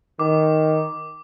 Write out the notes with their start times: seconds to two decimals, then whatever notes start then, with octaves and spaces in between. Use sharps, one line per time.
0.19 D#3 D6